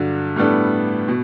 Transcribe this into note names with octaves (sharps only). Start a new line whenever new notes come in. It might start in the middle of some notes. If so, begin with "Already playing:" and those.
Already playing: G2 D3 F#3
A2 G3 B3 D4 A4
B2